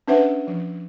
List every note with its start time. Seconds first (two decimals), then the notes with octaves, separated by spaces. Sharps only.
0.08 C#4 D4 B4 C5 E5 F#5
0.47 F3